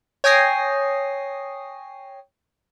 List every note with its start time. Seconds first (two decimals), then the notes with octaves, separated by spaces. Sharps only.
0.24 C#5 G5 G#5 D#6 A#6 C7